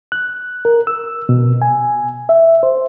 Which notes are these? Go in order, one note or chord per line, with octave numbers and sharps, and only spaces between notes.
F#6
A#4
E6
B2
G#5
E5
C5